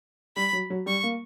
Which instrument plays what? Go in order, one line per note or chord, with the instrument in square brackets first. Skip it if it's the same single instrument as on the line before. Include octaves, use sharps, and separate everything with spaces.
[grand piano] G3 [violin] B5
[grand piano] F#3
F#3
[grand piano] G3 [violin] C#6
[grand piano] A#3